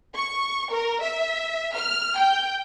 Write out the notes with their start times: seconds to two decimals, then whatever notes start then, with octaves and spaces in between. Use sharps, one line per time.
0.15 C#6
0.72 A#4
1.02 E5
1.75 F6
2.17 G5